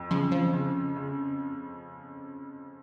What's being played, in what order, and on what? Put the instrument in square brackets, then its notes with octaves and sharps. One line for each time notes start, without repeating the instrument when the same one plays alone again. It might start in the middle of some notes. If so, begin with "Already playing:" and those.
Already playing: [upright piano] F2
[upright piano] C#3 [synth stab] F3
[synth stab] F3
[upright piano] C#3
C#3